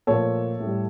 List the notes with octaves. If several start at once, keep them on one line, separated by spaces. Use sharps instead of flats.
A#2 F3 A3 A4 C#5
A2
G3